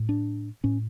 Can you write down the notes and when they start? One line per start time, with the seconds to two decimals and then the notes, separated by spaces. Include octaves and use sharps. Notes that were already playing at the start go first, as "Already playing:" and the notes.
Already playing: A2
0.09 D4
0.64 A2 C#4